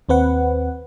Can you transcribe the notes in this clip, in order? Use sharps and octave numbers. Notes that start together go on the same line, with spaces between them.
D#2 C4 B4 F#5